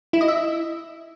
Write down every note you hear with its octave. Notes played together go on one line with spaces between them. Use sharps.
E4
D#5
E5